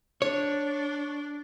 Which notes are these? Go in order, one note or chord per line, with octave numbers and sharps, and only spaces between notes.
D4 C#5